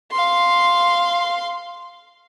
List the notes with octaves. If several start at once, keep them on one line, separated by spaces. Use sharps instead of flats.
F5 C6